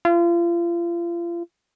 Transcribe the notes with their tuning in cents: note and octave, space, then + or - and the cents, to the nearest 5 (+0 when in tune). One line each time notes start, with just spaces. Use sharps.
F4 -35